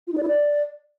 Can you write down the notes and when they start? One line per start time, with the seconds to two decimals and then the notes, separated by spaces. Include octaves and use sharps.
0.07 F4
0.12 D#4
0.18 D5
0.23 E4
0.28 D5